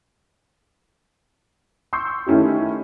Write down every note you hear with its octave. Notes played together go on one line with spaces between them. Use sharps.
C6 C#6 E6 G6 C7
D#3 A3 C#4 E4 G4